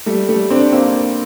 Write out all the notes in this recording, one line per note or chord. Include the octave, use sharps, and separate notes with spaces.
G3 A3
G3 A3
C4 D4
A#3 C4